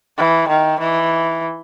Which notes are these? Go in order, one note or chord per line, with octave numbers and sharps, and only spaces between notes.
E3
D#3
E3